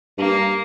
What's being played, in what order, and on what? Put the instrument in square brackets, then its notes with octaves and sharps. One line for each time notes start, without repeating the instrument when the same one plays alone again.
[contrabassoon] G2 [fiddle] A#3